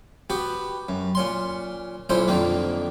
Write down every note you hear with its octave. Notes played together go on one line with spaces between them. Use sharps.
B3 F#4 G4
F#2
A#2 C#4 C6
B1 A#2 C#4 E4 C5
F2 D3 D#3 A#3